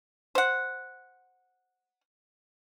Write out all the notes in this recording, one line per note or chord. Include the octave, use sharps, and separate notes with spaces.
C5 F#5